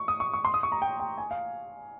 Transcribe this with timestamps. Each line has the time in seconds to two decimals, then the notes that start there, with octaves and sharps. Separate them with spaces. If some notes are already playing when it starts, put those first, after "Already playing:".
Already playing: C#6
0.08 D#6
0.20 C#6
0.33 C#6
0.45 C6
0.54 D#6
0.63 C#6
0.72 A#5
0.82 G5
1.00 G5
1.18 G#5
1.31 F5